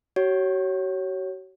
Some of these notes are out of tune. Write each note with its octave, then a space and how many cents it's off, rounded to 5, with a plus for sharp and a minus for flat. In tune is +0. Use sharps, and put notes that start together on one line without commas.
F#4 +40 C#5 +0